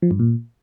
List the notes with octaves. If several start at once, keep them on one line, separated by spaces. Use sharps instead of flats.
F3
G2
A#2